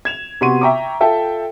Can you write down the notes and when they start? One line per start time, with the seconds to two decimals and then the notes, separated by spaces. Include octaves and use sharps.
0.05 G#6 E7 F7
0.41 C3 B3 F#4 C6 C#6 D#7
0.61 E5 G5 A#5 C#6 D6
1.00 F4 A4 E5 G5 A5